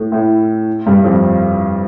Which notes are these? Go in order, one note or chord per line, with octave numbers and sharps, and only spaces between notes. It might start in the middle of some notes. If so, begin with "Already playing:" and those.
Already playing: A2 A3
A2 A3
G2 G3
F2 F3